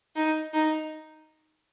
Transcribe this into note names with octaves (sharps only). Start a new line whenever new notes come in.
D#4
D#4